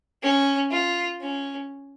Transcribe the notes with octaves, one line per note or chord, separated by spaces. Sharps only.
C#4
F4
C#4